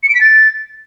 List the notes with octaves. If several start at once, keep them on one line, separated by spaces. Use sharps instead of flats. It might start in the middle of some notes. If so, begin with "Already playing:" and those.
C#7
D7
B6
A6